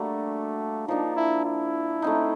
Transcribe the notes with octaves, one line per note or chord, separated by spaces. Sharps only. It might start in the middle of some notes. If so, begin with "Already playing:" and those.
Already playing: G3 A3 A#3 D4 F#4
F3 A#3 D4 D#4
E4
E4
A3 C4 D#4